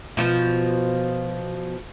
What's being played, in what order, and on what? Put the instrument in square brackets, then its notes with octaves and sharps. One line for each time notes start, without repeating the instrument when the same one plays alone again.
[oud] B2 F3